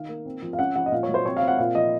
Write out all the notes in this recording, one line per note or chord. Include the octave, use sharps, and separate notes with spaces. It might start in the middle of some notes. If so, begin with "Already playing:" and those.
Already playing: D#3 F5
A#3
C4
F3
F5
C#4 F#5
F3 F#5
D#5
A#2 F5
C#5
F#3
C5
C4 C#5
F5
C4
F#5
A#2 F5
F3 D#5